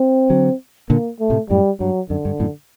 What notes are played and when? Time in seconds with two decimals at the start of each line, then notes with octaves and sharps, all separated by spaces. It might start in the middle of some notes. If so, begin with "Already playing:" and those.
Already playing: C4
0.30 D3 F#3
0.90 A#2 D3 A#3
1.20 A3
1.30 A2 C3
1.50 F#2 A2 G3
1.80 G2 F#3
2.10 F#2 D3
2.25 G2
2.40 F#2 A2